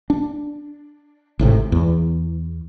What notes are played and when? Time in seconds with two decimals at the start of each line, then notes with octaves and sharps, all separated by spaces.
0.10 D4
1.39 G#1 A2 C3
1.72 E2